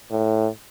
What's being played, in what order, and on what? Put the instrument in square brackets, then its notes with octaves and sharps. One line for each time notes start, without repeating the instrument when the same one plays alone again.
[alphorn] A2